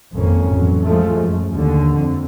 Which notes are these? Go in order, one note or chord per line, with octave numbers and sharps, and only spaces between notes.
G#1 F2 A#3 C#4
A1 F2 F#3
F3 G#3 A3
F#2
D#2 D3
F2